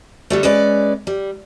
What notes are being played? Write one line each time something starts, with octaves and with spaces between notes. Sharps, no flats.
D3 G3 A3
G#3 C#4 B4 D5
G3